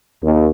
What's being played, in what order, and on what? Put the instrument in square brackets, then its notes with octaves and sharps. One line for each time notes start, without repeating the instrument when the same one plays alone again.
[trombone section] D#2